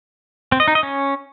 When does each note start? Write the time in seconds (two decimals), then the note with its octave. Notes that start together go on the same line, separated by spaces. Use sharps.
0.52 C4
0.60 D#5
0.68 D#4
0.75 D#5
0.83 C#4